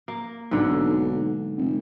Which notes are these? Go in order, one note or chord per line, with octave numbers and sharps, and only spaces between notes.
A#3
B1 G#2 D3
F1